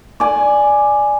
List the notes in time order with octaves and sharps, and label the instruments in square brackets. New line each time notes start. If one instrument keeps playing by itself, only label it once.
[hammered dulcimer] D5 G#5